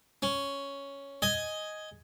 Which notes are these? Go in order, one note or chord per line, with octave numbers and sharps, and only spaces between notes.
C#4
D#5 G#5